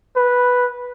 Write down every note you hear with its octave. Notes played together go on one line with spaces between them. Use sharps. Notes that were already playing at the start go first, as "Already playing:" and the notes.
B4